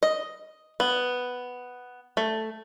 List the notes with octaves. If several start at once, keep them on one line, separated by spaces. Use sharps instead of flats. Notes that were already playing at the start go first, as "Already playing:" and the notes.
D#5
B3
A3